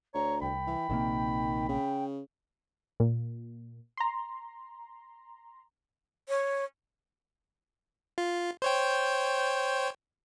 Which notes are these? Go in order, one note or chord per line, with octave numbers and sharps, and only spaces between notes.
D2 C#5 A#5
C2 G5 B5
E3
A#1 C3 D#3 A#3
C#3 G5
A#2
A#5 C6
C#5
F4
C5 C#5 G5